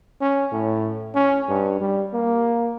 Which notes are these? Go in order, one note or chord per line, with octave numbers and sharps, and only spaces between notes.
C#4
A2
C#4
G2
G3
A#3